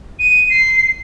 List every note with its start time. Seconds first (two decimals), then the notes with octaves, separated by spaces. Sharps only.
0.19 D#7
0.50 C7